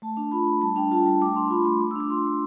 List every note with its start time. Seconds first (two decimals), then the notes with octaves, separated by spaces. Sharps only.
0.02 A3 A5
0.17 D4
0.32 F4 B5
0.47 A3
0.61 G3 A5
0.76 D4 G5
0.91 F4 A5
1.06 G3
1.21 A3 D6
1.36 D4 C6
1.50 F4 B5
1.65 A3 C6
1.81 A3 D6
1.91 E6
1.96 D4 D6
2.10 F4 C6
2.25 A3